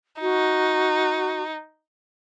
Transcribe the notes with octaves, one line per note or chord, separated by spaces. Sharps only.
D#4 F#4